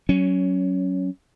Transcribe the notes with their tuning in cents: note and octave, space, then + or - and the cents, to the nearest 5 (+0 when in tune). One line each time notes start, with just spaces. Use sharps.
F#3 +15 C#4 +0